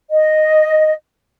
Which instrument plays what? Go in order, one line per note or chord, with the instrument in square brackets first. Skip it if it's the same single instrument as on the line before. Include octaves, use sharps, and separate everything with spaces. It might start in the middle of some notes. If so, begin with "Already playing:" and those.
[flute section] D#5